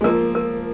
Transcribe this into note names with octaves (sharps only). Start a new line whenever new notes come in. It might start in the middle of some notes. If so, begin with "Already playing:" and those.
G#3
F3 A#3 A#4
A#4